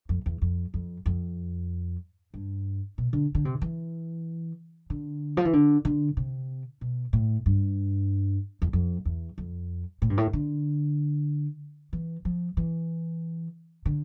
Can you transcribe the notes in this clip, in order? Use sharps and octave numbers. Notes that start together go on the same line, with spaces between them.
F2
E2
F2
F2
F2
G2
B2
D3
D3
C3
E3
D3
F3
E3
D3
D3
C3
B2
A2
G2
E2
F2
E2
F2
A2
G2
A2
D3
E3
F3
E3
D3